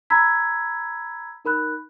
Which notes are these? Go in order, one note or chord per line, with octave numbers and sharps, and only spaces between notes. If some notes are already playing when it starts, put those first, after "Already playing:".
A#5 B5 E6 G#6 B6
D#4 A#4 B5 F#6